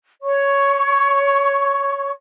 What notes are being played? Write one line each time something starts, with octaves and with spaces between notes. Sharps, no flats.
C#5 C#6